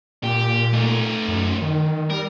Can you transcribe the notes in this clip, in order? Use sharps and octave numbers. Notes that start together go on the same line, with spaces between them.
A#2 G4
A3 D#4
F#2
D#3
G3 A#4